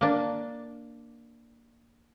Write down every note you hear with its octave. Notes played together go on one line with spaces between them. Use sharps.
A#3 D4